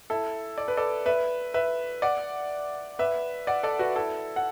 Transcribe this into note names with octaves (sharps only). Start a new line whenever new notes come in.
E4 A4
D5
B4
A4 D5
B4 E5
B4 E5
D5 F#5
B4 E5
D5 F#5
A4 D5
F#4 B4
E4 A4
F#5